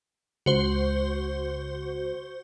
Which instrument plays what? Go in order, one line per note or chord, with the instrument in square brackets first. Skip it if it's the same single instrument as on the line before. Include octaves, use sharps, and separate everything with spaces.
[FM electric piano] C#2 [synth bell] F#4 C5